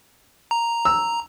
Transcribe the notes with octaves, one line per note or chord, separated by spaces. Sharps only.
A#5
E6